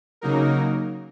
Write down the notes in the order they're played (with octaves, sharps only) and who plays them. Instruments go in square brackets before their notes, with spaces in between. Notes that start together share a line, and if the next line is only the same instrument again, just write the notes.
[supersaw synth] C#3 F#3 A#3 D#4 A#4